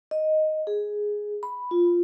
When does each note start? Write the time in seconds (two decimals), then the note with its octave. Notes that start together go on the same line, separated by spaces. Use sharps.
0.11 D#5
0.67 G#4
1.43 B5
1.71 F4